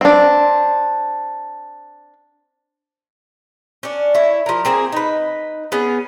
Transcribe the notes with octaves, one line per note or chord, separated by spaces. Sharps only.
C4 D4
C#4 D4
E4 C#5
F3 A#4
A#3 C4 G#4 A#4
D#4 B4
B3 C#4 G#4